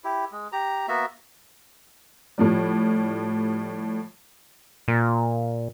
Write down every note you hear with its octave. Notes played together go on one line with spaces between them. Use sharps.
E4 G4
G#3
G4 A#5
A#3 B3 F#4 E5
A2 F3 G3
A#2